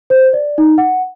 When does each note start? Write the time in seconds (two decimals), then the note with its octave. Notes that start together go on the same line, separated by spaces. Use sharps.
0.10 C5
0.33 D5
0.58 D#4
0.78 F#5